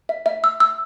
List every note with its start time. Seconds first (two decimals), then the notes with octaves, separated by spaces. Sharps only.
0.09 E5
0.26 E5
0.44 E6
0.60 E6